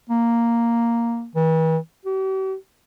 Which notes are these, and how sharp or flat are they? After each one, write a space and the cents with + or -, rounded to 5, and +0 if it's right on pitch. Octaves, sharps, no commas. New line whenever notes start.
A#3 +0
E3 -40
G4 -45